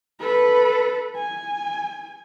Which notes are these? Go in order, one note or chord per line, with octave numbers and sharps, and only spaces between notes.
A4 B4
G#5